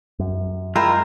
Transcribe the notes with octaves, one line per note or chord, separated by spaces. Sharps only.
F#2
G#3 E4 F4 A#4 G5 E6